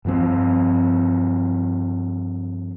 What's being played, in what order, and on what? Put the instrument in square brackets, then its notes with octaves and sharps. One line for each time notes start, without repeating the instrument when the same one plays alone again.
[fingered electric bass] G2 F3 C4